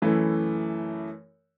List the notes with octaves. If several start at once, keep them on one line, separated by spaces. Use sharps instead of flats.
F#2 E3 A3 E4